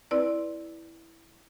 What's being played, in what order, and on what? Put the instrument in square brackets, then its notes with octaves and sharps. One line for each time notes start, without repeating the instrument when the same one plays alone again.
[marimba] C4 E4 B4 D5